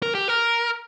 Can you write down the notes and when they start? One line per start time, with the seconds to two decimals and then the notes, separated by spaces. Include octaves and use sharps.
0.02 A#4
0.15 G4
0.28 A#4